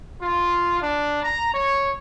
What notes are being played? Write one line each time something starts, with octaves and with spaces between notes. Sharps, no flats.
F4
D4
A#5
C#5